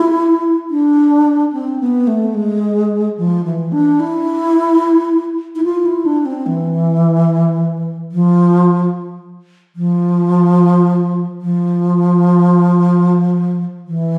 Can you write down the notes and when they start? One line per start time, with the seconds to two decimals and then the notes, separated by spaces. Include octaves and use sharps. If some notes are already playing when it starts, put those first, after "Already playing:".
Already playing: E4
0.70 D4
1.53 C4
1.80 B3
2.07 A3
2.35 G#3
3.18 F3
3.45 E3
3.72 D4
4.00 E4
5.56 E4
5.64 F4
5.86 E4
6.06 D4
6.26 C4
6.46 E3
8.12 F3
9.76 F3
11.41 F3
13.87 E3